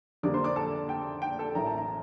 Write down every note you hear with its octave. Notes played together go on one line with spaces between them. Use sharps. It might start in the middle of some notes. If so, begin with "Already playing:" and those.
F2 D3 G3 A#3 D5 D6
C5 C6
D5 D6
A4 A5
G5
G5
A4 A5
A1 A2 E3 A#4 A#5
A5
A#5